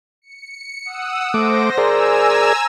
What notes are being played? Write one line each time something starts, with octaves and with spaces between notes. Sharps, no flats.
C#7
F#5 D#6 E6
A3 C5 D6 A#6
G#4 A#4 D5 G#5 A#5 E6